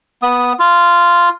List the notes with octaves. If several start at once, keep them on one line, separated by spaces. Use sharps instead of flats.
B3 D#6
F4